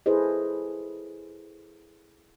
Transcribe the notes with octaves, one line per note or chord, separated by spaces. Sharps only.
E4 G#4 A4 B4 C5 D#5